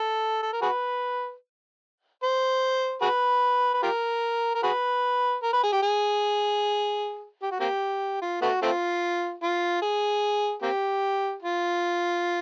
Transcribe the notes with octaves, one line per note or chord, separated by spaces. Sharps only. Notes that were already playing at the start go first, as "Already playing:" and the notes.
Already playing: A4
A4
A#4
F#4 G#4 B4
C5
F#4 G#4 B4
B4
F4 G4 A#4
A#4
F#4 G#4 B4
A#4
B4
G#4
G4
G#4
G4
F#4
A#3 C4 G4
F4
A3 B3 F#4
A3 C4 F4
F4
G#4
A#3 C4 G4
F4